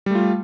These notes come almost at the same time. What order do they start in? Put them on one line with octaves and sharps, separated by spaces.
G3 A3 F4